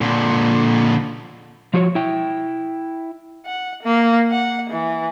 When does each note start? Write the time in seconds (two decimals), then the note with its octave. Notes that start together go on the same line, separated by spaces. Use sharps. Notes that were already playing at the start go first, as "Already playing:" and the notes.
0.01 A#2 D3
1.74 F3 F4 F#4 A4 C#5
1.95 E4 G5
3.46 F#5
3.83 A#3
4.31 F#5
4.70 E3